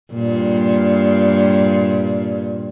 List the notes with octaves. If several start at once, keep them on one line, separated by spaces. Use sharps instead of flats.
G2 A#2